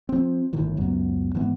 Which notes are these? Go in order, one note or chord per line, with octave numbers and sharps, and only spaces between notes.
F3 C4
G1 A2 D#3 E3
C#2 F#2 F#3 B3
G#2 E3 G#3 B3